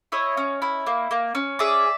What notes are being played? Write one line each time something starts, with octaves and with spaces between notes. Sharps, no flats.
E4 C#5 D#5
C#4
E4
A#3
A#3
C#4
G#4 D5 E5